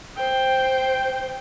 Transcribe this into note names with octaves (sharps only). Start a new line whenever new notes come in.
C5 G5